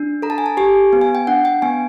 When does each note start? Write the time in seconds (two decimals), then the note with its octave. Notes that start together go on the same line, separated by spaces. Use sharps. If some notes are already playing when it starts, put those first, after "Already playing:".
Already playing: D4
0.22 A4 A#5
0.30 A5
0.38 G#5
0.46 A5
0.57 G4 G#5
0.93 B3
1.01 G#5
1.15 G5
1.27 D4 F#5
1.45 G5
1.62 B3 G#5